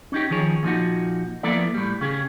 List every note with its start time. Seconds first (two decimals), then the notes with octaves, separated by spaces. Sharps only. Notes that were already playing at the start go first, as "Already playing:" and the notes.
0.12 C#4 D#4 G4
0.30 D#3 F3 G#4 C#5
0.63 A#2 F3 D#4 F#4
1.43 F3 A#3 B3 E4 A4 D5
1.74 A2 G3
2.01 C#3 C#4 G4 G#4